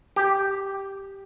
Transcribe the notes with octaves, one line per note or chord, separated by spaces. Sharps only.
G4